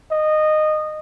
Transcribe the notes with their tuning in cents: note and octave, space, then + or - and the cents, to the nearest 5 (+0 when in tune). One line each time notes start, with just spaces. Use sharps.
D#5 -15